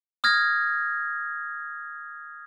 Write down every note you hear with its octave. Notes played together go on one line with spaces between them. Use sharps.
D#6 F6 G#6 A#6